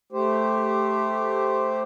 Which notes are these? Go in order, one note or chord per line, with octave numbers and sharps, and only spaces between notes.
A3 G4 C5